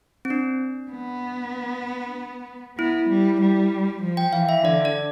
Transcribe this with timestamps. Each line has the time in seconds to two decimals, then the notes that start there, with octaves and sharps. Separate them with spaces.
0.25 C4
0.30 D4
0.92 B3
2.78 B3 E4
3.09 G3
3.41 G3
4.02 F3
4.17 G5
4.33 E3 F5
4.49 E5
4.64 D3 D5
4.85 D5